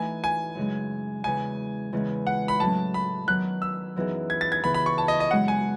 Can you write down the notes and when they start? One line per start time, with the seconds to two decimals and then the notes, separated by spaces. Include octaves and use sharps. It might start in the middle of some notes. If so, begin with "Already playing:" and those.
Already playing: E3 A3 D#4 G#5
0.24 G#5
0.55 F#2 C#3 G#3 C#4
1.24 E2 C#3 G#3 G#5
1.93 E2 C#3 E3 G#3 C#4
2.27 F#5
2.48 B5
2.60 A2 F#3 C#4 A5
2.94 B5
3.27 D#3 F#3 B3 F#6
3.62 E6
3.96 F#2 E3 B3 D#4 G#4
4.30 G#6
4.41 A6
4.52 G#6
4.63 C#3 E3 B3 B5
4.74 B5
4.86 C#6
4.98 A5
5.08 D#5
5.20 D#5
5.31 F#2 C#3 G#3 F#5
5.48 G#5